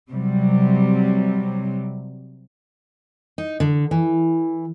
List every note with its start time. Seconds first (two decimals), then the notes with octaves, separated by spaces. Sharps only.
0.11 C3 F#3 G3
3.38 D#4
3.60 D3
3.91 E3